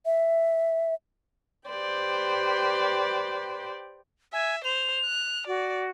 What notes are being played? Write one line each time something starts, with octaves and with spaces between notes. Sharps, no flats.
E5
G4 B4 C5 D5 G5
E5 G#5
C5 F7
F#6
F#4 D5